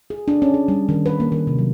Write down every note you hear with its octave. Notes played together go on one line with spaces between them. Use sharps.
G#4
D4
C#4
G#4
G3
D#3
B4
A#3
D#3
C3
F#3